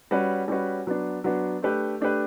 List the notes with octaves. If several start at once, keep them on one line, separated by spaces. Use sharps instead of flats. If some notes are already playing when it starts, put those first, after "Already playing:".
G3 C#4 F#4 B4
G3 C#4 F#4 B4
F#3 B3 D4
F#3 B3 D4
A3 D4 G4 B4
A3 D4 G4 B4